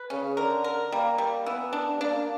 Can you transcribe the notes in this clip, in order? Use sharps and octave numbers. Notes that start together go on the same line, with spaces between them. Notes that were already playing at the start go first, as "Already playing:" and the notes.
Already playing: B4
C#3 C#4
D3 A#4
A#4
G3 A#3
G3
E3 B3
D4
G3
A#3 D4